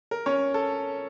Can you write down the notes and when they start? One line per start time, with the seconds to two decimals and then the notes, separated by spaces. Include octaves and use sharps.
0.11 A#4
0.26 C#4 C#5
0.54 A4